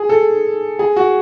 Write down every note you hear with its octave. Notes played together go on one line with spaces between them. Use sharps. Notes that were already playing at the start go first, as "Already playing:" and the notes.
Already playing: G#4
A4
G#4
F#4